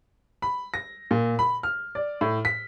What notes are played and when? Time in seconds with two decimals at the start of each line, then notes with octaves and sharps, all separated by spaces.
0.42 B5
0.74 A#6
1.11 A#2
1.39 B5
1.63 F6
1.95 D5
2.21 A2
2.45 B6